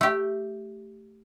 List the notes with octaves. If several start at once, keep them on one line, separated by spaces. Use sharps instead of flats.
A3 G4